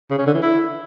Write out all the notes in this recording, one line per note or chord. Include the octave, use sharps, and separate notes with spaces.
C#3
C#4
D3
E3
E4